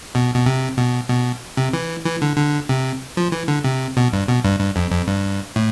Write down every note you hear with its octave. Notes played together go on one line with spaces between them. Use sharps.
B2
B2
C3
B2
B2
C3
E3
E3
D3
D3
C3
F3
E3
D3
C3
B2
G2
B2
G2
G2
F2
F2
G2
A2